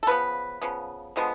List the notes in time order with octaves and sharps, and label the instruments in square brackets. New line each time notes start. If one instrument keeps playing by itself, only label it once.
[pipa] A4
C#3 F3 B3 B4
C#3 F3 B3
D3 F3 G#3 B3